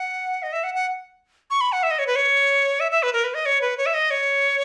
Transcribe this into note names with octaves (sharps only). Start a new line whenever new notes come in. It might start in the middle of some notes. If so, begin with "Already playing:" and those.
Already playing: F#5
D#5
E5
F#5
F#5
C#6
B5
F#5
E5
D#5
C#5
B4
C#5
E5
E5
B4
A#4
B4
D#5
C#5
B4
C#5
E5
D#5
C#5